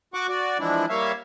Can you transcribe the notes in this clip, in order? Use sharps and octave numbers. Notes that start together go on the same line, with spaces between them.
F#4 F#5 C#6 D6
F#4 D5
E3 F3 G#3 D4 E4
G3 A#3 C#5 E5 F5